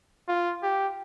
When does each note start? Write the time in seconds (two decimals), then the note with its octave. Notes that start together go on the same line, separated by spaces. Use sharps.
0.28 F4
0.63 G4